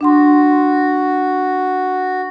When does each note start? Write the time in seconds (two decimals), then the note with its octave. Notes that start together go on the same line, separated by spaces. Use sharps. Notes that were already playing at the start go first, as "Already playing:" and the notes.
0.01 D4 F#4 F#5 C6